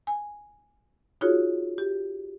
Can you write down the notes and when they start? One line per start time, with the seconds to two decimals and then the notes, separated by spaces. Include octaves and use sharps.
0.07 G#5
1.21 D#4 F4 F#4 G#4 C#5
1.78 G4